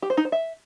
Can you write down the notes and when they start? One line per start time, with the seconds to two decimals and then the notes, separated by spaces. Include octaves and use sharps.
0.02 G4
0.10 C5
0.17 D#4
0.25 C5
0.32 E5